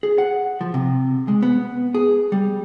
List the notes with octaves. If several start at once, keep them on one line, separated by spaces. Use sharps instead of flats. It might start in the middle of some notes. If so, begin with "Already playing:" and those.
G#4
F#5
F3
C3
G#3
B3
G#4
G3